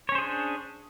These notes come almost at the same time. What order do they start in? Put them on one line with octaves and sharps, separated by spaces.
C#5 C#4 C5 G#4 D4